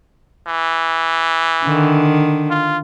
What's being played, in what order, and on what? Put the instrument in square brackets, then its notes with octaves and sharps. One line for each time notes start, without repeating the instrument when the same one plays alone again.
[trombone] E3
[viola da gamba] D3 D#3
[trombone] F4